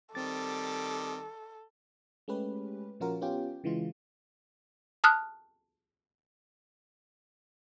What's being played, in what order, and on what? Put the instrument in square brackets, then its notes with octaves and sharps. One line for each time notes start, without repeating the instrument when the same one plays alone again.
[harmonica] D#3 G3 D6 [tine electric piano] C4 A6 [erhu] A4
[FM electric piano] G#3 A3 C#4 G4 B4
A#2 F3 C#4 F4 F#4 A#4
B3 C#4 F4 G4 G5
C#3 E3 G#3 F4
[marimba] A5 D#6 F6 F#6